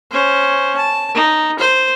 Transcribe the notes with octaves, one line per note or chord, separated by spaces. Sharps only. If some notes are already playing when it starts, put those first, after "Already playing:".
C#4 C5
A5
D#4
C5